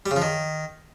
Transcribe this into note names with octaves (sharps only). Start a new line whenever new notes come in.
G3
C#3
F3
D#3